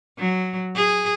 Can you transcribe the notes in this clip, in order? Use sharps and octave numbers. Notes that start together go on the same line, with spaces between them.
F#3
G#4